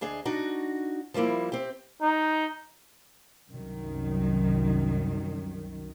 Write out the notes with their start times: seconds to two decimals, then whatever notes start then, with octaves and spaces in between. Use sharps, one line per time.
0.01 D2 D4 G#4 D#5
0.25 D4 D#4 F#4
1.14 F3 G3 A3 A#3 E4
1.52 C4 G4
2.02 D#4
3.50 C2 F#2 D#3